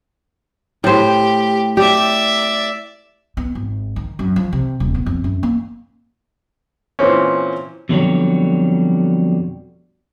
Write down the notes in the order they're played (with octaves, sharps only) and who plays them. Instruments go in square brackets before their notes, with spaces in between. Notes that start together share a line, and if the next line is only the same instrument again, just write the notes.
[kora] A2 C5 [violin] G4
[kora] G4 [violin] D5 E5
[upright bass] B3
G#1
D#3
F#2
F3
C3
D#1
B3
F2
F#2
A#3
[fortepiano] A#2 E3 C4 C#4
[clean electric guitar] F2 B2 D3 D#3 F#3 G3